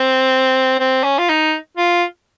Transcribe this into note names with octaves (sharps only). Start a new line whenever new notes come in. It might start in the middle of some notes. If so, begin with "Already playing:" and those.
Already playing: C4
C4
C#4
F4
D#4
F4